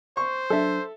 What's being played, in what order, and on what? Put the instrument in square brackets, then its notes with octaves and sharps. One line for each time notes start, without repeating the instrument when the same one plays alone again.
[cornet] C5 [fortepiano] C#6
[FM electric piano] F#3 D4 [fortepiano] A4 E5